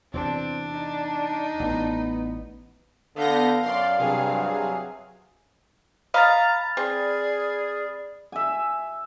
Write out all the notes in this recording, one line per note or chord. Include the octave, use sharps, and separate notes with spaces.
E2 C3 E3 C4 D4
D#4
A1 B3
D3 B3 F5 G6 A#6
F#2 D5 C6
G2 C3 F#3 G#4
D#5 F5 A#5 B5 F6 A6
C4 G#4 D5
E5 G#5